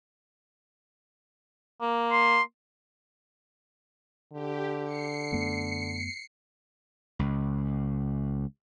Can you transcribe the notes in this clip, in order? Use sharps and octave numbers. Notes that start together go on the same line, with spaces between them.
A#3
C6
D3 G4
C7 C#7
F#2 A3 B3
C#2